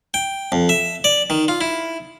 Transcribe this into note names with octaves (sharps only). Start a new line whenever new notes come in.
G5
F2
E5
D5
D#3
F4
E4